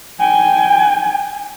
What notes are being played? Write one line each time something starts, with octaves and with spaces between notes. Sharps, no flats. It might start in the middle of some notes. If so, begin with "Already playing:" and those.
G5 G#5